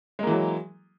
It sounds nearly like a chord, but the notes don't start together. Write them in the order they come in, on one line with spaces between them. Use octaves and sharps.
G#3 A#3 E3 F#3